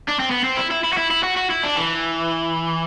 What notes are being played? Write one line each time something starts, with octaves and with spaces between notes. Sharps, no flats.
D4
C4
B3
C4
E4
E4
E4
F#4
E4
E4
F#4
F#4
E4
D4
E3